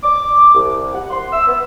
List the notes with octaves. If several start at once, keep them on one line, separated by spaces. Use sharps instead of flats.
D6
C2
F#5
C6
E6
B3